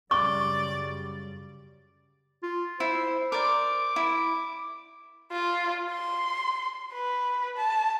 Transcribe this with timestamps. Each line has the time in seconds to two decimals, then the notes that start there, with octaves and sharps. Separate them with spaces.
0.11 F#2 C#3 G3 D5 C#6 D6
2.43 F4
2.80 E4 C5
3.32 A#4 C5 D5 D6
3.96 E4
5.31 F4
5.91 C6
6.93 B4
7.57 A5